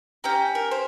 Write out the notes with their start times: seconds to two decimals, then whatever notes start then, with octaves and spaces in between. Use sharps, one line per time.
0.24 C#4 G4 G5 A#5
0.55 A#4
0.71 C5